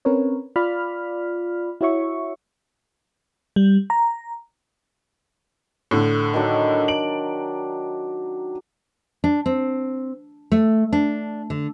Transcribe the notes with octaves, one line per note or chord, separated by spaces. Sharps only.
C4 C#4 A#4 B4 C#5
F4 D5 B5 F6
E4 F#4 C#5 E5 C#6
G3
A#5
A2 D3
D#3 F#3 D4
D7 F#7
D4
C4
A3
D4
D3